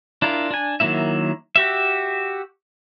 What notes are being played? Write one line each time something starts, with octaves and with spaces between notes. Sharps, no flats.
D4 E4 F4 A#4
D4 G#5
D#3 F#3 A#3 E4 E5
F#4 G4 E5